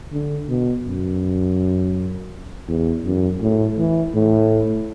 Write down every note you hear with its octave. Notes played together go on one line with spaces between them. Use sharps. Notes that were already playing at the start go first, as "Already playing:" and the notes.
D3
B2
F#2
E2
F#2
A2
E3
A2